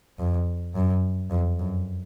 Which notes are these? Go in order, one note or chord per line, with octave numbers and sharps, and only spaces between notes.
F2
F#2
F2
F#2